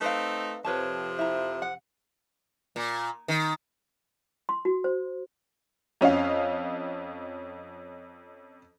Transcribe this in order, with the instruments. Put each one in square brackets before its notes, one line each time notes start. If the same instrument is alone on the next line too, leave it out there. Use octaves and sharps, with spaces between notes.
[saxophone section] A3 C4 D#4 [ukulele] B4 F5
[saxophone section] F2 C3 F3 [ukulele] B4 C#5 A5
[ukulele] E4 A#5
F#5
[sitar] A#2
D#3
[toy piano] C6
F#4
C5
[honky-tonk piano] F2 C#4 D#5 F5